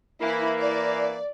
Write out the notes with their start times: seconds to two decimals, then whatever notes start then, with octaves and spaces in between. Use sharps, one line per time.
0.21 E3 A#3 E4 B5
0.60 D5